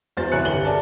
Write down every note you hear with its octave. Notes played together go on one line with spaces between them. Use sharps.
E2 F#3 C5 A6
C2 E4 C#5 G#5 F#6 C#7
G1 C2 G4 F#7 G7
G#4 A#4 D5 G#5 A5